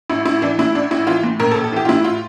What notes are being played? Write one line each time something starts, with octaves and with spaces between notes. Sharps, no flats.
A1 E4
A1 E4
E3 D4
A2 E4
A1 D4
A1 E4
E3 F4
A2
A#1 A#4
A4
A#1
A4
E3 G4
F4
A2 E4
F4